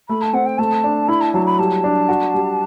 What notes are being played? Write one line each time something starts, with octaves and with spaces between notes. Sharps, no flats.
A3 B5
A5
C4 F#5
G5
A3 A5
D4
E4 B5
A5
F#3 A5
B5
G3 A5
D4
F#4
G3